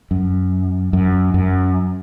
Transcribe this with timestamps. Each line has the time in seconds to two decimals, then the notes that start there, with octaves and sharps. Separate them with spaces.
0.11 F#2
0.93 F#2
1.34 F#2